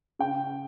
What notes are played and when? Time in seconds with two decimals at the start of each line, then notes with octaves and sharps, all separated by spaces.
0.19 C#3 G5